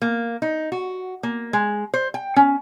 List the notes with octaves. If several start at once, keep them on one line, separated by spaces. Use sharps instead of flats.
A#3
D#4
F#4
A#3
G#3
C5
G5
C#4